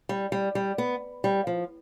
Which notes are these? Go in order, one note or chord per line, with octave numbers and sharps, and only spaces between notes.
G3
G3
G3
B3
G3
F3